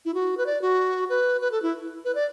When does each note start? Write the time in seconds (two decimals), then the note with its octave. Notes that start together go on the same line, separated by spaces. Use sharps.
0.05 E4
0.14 F#4
0.37 B4
0.46 D5
0.62 F#4
1.09 B4
1.41 B4
1.52 A4
1.62 E4
2.05 B4
2.15 D5